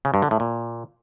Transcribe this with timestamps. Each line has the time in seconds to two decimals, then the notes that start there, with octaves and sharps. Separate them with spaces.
0.05 C#3
0.14 G2
0.22 D3
0.31 A2
0.40 A#2